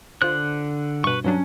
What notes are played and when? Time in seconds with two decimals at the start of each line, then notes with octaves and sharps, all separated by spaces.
0.22 D3 F4 C5 F#6
1.04 G2 B2 B4 C#6
1.24 G2 F#3 C#4 D4